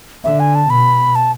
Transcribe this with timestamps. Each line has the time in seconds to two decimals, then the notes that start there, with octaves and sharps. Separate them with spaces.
0.24 D3 E5
0.40 G#5
0.55 A5
0.69 B2 B5
1.16 A5